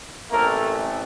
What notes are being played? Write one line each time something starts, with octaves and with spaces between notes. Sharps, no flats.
A1 A2 A3 A#3 C4 A#4